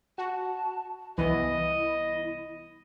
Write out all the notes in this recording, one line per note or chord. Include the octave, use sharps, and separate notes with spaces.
F#4 A5
C2 E3 B3 E4 D#5